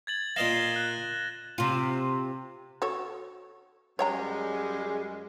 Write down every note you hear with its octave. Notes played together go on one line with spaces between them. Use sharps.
G#6 A6 F#7
A#2 D#5 F5 A#6 E7 G7
F#6
C3 F4
F#4 A4 C#5
F#2 G3 G#3 C#5 G5 A#5